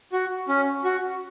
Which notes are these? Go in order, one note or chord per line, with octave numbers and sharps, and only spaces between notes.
F#4
C#4
F#4